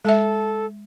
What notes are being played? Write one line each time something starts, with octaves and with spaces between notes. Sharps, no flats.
G#3 A4 E5